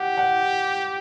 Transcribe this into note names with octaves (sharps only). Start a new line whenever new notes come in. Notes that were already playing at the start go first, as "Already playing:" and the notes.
Already playing: G4 F#5
F#5